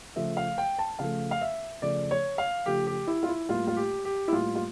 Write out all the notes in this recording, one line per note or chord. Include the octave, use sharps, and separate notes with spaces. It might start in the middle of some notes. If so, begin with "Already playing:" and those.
C#3 F3 A3 E5
F5
G5
A5
C#3 F3 A3 F5
F5
E5
C#3 F3 A3 D5
C#5
F5
C#3 F3 A3 G4
G4
E4
F4
E4
A2 G3 A#3 F4
F4
G4
G4
E4
A2 G3 A#3 F4
F4